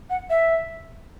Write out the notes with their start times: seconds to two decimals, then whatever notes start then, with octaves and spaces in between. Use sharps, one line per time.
0.10 F#5
0.30 E5